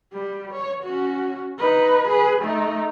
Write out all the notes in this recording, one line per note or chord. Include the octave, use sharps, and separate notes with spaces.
G3 G4
C#5
C#4 F#4
D#4 B4
G#4 B4
A3 D#4